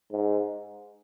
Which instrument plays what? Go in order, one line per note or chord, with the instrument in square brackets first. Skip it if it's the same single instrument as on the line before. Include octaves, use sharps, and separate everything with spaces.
[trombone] G#2